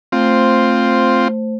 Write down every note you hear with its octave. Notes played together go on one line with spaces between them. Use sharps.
A3 C4 F4 C5